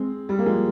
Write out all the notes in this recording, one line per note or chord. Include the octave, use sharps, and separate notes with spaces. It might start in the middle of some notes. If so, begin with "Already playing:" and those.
Already playing: G#3 C4
G3
A#3
F3 G#3